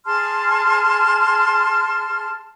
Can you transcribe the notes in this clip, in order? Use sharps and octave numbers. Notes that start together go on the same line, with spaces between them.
G#4 A5 C6 F6